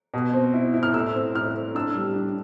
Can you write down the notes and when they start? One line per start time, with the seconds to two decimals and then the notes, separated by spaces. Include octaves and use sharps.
0.14 B2
0.33 C4
0.54 E4
0.74 E4
0.83 F6
0.94 A2 E6
1.14 C4
1.35 A2 F6
1.55 C4
1.75 D4 E6
1.95 G3
2.16 D4